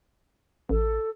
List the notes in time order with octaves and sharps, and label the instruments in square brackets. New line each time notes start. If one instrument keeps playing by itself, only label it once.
[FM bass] A1 [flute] A4